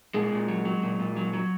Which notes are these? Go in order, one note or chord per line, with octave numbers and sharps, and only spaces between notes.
A#2 G#3
A#2
F#3
F#3
A#2
A#2
F#3
F#3